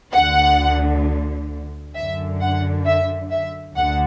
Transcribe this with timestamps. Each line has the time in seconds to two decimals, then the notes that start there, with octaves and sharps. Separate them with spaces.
0.13 D2 D3 F#5
1.95 F#2 D3 E5
2.41 F#5
2.85 E5
3.31 E5
3.75 D2 D3 F#5